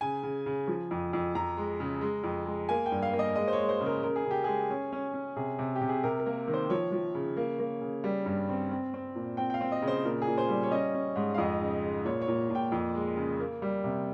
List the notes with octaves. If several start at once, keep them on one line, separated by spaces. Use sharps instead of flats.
C#3 G#5
C#3
C#3
F3
F2
F2
F2 A#5
G#3
C#3
G#3
F2
G#3
A#3 G#5
G5
G2
F5
A#3
D#5
G#3 D#5
C5
C#5
G#3
C5
C#3
A#4
C#3 A#4
G#4
C#3
G4
G#3 G#4
C#4
C#4
C#4
C3 G#4
C3
G4
C3
G#4
C3 A#4
A#4
A#3
D#3
C5
F3 C#5
F3
C#3
A#3
A#3
C#3
G3
G2
C4
C4
C4
A#2
C4 G5
G5
F5
C4
D#5
C#3
C5
A#2 A#4
G#4
A#2
C5
G3
C#5
C#4 D#5
C#4
G#2
F5
F2 D#5
C#3
G#3
A#2 C#5
C#5
A#2
A#2
G5
F2
G#3
C#3
A#3
G3
C3